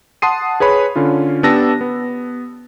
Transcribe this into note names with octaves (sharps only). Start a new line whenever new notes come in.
F#5 A5 C6 D#6 C7 D#7
G#4 B4 C#5 B5
D3 C#4 F4
B3 D4 G4 A5 E6 A#6
B3